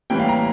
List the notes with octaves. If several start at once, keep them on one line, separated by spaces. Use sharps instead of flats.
A2 E3 G3 A#3 G5
F5
A#5